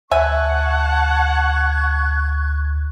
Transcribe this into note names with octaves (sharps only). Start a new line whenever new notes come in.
D2 E5 F#5 G#5 A5 C#6 F#6 G#6